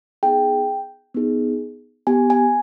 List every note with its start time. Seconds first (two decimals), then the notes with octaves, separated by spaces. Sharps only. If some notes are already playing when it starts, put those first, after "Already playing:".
0.23 B3 D#4 G#4 G5
1.14 B3 D#4 G#4
2.07 B3 G4 G#5
2.30 G#5